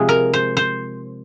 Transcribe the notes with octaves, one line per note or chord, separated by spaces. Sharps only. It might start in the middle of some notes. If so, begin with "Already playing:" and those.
Already playing: C3 F3 G#3 G#4
A#4
C5
C5